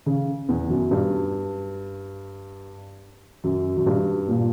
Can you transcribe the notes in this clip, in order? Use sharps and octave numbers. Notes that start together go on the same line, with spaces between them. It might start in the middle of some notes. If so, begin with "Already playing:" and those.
C#3
E2
F#2
G2
F#2
F#2
G2
A#2